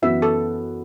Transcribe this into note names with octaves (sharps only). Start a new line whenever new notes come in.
F#2 E3 B3 F#4 E5
A4